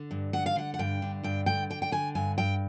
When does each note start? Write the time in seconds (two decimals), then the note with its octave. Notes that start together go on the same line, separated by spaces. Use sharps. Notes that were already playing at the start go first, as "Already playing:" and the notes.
Already playing: D3
0.11 G2
0.33 D3 F#5
0.46 F5
0.56 D3 F#5
0.74 F#5
0.79 G2 G5
1.02 D3
1.23 G2 G5
1.46 D3 G5
1.70 D3 G5
1.82 G5
1.92 D3 G#5
2.15 G2 G#5
2.38 G2 G5